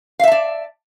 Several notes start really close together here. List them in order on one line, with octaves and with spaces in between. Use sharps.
F5 E5 A5 D5